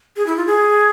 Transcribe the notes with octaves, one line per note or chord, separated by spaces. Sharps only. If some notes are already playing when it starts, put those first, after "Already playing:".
G#4
E4
F4
G#4